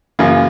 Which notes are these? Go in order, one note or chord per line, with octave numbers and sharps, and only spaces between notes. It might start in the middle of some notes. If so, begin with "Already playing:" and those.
F#2 C#3 E3 A#3